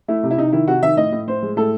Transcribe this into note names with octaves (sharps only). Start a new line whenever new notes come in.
A3 E4
C3
E4
C3 D#4
D#3 E4
C3 F#4
D#3 E5
A2 D#5
A2
A2 C5
G#3
A2 A4